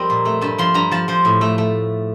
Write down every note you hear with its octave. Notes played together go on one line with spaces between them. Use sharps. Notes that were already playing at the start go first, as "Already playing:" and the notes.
Already playing: F2 G3 C4 A#4 C5 D#5
A#2
A3
G2 A5
F3 C6
G2 A#5
F3 A5
F3 C5
A2
A3
A3